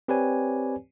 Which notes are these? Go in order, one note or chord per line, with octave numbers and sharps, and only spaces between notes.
C4 G4 B4 C#5 D5 G#5